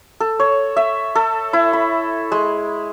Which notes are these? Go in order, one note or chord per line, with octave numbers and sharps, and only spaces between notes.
A4
C#5
E5
A4
E4
B5
G#3